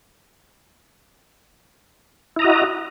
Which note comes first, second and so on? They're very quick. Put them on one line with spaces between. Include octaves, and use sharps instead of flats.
E4 A#5 D#5 F#4